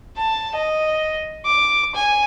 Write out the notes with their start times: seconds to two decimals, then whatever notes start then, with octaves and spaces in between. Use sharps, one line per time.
0.17 A5
0.54 D#5
1.46 D6
1.95 G#5